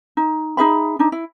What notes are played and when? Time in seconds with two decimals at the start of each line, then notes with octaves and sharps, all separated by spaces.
0.17 D#4
0.57 D#4 G#4 E5 B5
0.99 D4 D#4
1.12 E4